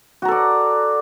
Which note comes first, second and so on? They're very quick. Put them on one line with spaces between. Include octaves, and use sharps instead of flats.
F#4 A#5 A4 D5